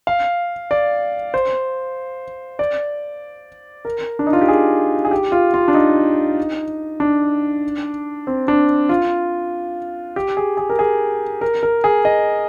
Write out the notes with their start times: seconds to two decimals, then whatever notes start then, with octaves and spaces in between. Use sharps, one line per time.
0.07 F5
0.71 D5
1.34 C5
2.59 D5
3.85 A#4
4.19 D4
4.27 D#4
4.33 F4
4.41 G4
4.48 G#4
5.05 G#4
5.11 G4
5.32 F4
5.54 F4
5.68 D4
5.74 D#4
7.00 D4
8.27 C4
8.48 D4
8.89 F4
10.16 G4
10.37 G#4
10.57 G#4
10.70 A#4
10.79 G#4
11.41 A#4
11.63 A#4
11.84 G#4
12.05 D#5